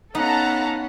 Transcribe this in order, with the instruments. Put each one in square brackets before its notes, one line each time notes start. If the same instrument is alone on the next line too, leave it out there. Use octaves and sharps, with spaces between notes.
[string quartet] B3 C#4 [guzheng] D#4 [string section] A4 A5 A#5 [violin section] F5 F#5